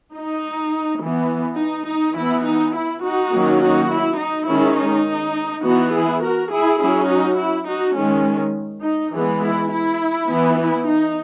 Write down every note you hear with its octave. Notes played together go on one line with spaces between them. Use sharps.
D#4
E3 B3
D#4
D#4
E3 B3 E4
D#4
E4
D#4 F#4
D#3 F#3 A#3 C#4
D#4 F#4
E4
D#4
D#3 G#3 C#4 E4
D#4
E3 B3 D#4 F#4
E4 G#4
F#4 A#4
E4 G#4
F#3 C#4 E4 G#4
D#4 F#4
E4
D#4 F#4
D#3 G#3 C#4
D#4
E3 G#3 B3
E4
E4
E3 B3
E4
D#4